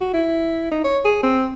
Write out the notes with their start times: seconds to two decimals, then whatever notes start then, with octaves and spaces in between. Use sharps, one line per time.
0.01 F#4
0.13 E4
0.71 D#4
0.84 C#5
1.05 G#4
1.23 C4